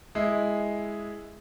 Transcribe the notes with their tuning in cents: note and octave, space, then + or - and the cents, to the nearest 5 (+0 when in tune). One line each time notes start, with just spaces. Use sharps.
G#3 +0 E4 +0